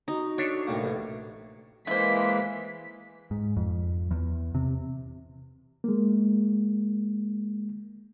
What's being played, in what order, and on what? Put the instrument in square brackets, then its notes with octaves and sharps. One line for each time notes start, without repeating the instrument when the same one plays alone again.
[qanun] D#4 [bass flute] F#4
[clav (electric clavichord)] D4 A4 E5 [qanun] C#5
[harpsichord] A2 C3 A#3
[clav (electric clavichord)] A1
[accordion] E3 G#3 A#3 [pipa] E4 C5 [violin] B6
[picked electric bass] G#2
F2
E2
C3
[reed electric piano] G#3 A#3